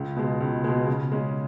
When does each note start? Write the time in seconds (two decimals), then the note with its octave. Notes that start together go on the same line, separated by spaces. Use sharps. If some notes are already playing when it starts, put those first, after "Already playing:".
Already playing: C#2
0.16 B2 G#3
0.40 C#2
0.64 B2 G#3
0.87 C#3
1.12 G#3 C#4